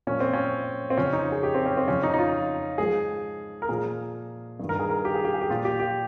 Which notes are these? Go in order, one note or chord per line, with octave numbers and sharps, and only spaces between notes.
A#2 F3 C#4
C4
C#4
C4
F2 C#3 F3 C#4
D#4
G#4
G4
C4
C#4
C4
F2 C#3 F3 C#4
D#4
D#4
F4
G#2 F3 G#4
A#4
A#2 F3 G#4
G2 D#3
A#4
G#4
A#4
G4
G#4
G4
G#4
G4
A#2 F3 F4
G4
G4